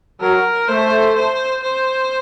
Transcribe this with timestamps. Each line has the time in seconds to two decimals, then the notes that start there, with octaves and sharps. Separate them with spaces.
0.21 F#3 A#4
0.68 A3 C5
1.16 C5
1.63 C5